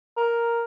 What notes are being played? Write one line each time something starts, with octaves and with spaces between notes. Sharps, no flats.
A#4